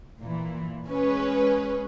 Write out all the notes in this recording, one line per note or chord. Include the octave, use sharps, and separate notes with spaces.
A#2 E3
G#3 C#4 G#4 B4